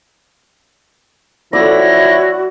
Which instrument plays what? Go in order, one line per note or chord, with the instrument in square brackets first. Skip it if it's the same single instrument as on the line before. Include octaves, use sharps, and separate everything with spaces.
[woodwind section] F3 C#4 E4 [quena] F#4 [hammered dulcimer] D5 [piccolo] A#6